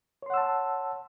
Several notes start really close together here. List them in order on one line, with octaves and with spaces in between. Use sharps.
C#5 C6 F#5 E6 A5